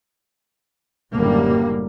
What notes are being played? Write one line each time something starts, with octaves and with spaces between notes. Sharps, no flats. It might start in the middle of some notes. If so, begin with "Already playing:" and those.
F#1 A2 D3 G3 A#3